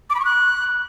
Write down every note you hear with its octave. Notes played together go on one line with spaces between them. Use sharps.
D6
B5
C#6
F#6